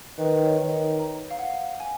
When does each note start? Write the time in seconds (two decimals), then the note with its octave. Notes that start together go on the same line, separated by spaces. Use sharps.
0.19 D#3 B4
0.45 C#5
0.59 D#3
0.99 A#5
1.31 F5
1.39 F#5
1.80 G#5